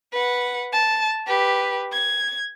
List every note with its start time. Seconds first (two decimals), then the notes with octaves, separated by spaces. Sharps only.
0.13 B4 F#5
0.72 A5
1.27 G4 B4
1.92 G#6